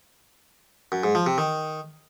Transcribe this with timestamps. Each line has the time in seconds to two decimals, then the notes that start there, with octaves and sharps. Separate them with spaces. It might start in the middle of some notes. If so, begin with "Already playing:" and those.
0.92 F#2
1.03 G#2
1.15 F3
1.26 C3
1.38 D#3